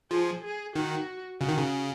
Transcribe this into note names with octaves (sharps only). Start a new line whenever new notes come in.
F3 G#4
G#4
D#3 F#4
C#3 F#4
D#3
C#3